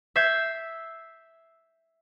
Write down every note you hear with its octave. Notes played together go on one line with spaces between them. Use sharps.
E5 E6 G6 G#6 C7